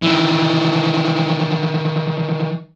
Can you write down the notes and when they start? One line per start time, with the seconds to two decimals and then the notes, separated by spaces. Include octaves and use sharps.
0.03 D#3 E3